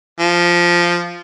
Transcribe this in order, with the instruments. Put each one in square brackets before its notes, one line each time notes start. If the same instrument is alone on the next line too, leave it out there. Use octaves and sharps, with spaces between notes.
[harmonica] F3